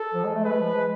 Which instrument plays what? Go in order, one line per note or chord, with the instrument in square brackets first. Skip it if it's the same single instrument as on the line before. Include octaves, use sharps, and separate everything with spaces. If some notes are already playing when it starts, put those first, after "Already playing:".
Already playing: [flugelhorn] A4
[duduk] F3
G#3
A3
[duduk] G#3 [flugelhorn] B4
[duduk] F3
G#3